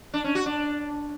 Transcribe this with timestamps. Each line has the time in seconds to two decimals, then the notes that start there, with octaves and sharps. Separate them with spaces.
0.14 D4
0.24 C#4
0.35 F#4
0.46 D4